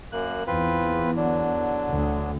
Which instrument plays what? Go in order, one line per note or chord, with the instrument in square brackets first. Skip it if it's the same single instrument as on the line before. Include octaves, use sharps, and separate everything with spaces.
[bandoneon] F#2 A#3 F#6
[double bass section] E2 [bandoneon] C4 F4 B4
[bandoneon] D3 F#3 D4
[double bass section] D2